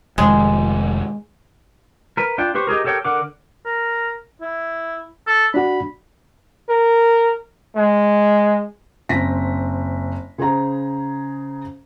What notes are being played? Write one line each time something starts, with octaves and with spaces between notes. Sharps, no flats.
F1 D#3 G#3
A#4 B4
D4 F4 G5
G4 B4 C5 C#6
D#4 G4 G#4 A#4
G4 A4 A#4 C#5 G5
D3 A#4 F#5 D6
A#4
E4
A4
D4 F#4 B5
A#4
G#3
F#1 C4 A#6 B6
C#3 G#4 C5 A#5